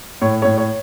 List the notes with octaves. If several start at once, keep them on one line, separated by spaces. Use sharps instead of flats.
A2 C#5
A2 C#5
C#5